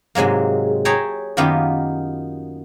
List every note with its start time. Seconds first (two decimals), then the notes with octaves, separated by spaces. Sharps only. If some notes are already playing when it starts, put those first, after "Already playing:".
0.15 G#2 C3 F#3 G#3 A#3
0.85 G#4 C#5 E5 G5 A5 A#5
1.37 F#2 D#3 A#3 B3 F4 G4